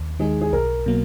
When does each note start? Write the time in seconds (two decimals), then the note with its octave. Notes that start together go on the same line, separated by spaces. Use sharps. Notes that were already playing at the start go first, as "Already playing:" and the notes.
Already playing: D#2
0.19 D#3 G#3 D#4 G#4
0.41 G#4
0.52 B1 A#4
0.86 B2 F#3 A#3